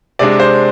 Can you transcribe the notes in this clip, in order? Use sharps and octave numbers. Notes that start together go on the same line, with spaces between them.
C3 G#3 D4 D5
C5